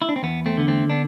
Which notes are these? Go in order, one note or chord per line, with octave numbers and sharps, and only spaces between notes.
E4
D4
C4
E2 B3
A3 C4
D3 B3
A3 C4
B3 D4